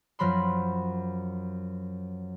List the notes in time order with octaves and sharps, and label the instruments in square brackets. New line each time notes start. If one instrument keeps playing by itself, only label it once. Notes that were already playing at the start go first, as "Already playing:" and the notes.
[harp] F#2 F3 F#3 B5 C6